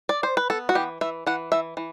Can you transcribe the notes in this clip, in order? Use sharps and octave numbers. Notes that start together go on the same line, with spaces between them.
D5
C5
B4
B3 A4
F#4
E3 G4
E3 E5
E3 F#5
E3 E5
E3